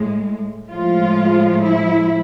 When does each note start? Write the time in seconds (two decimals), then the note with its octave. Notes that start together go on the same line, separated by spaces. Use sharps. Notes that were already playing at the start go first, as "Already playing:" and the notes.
Already playing: A2 G#3
0.70 A2 F3 G#3 F4
1.62 E4